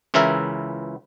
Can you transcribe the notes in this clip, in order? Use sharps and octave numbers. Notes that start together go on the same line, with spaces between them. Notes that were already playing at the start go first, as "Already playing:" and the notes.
C#2 C#3 E3 E4 A#4 E5